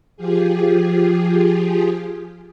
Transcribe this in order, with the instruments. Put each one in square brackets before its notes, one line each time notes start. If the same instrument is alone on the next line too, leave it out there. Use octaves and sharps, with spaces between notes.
[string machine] F3 F4 G4 G#4